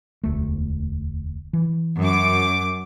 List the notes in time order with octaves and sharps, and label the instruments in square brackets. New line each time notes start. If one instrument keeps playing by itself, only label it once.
[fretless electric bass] E1 D2 A3
E3
[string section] F#2 D6